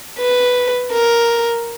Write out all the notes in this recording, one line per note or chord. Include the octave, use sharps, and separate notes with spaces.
B4
A#4